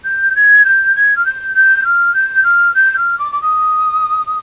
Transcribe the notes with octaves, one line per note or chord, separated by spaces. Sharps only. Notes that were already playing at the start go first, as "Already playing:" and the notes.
G6
G#6
G6
G#6
F6
G6
G6
F6
G6
F6
G6
F6
D6
D6
D#6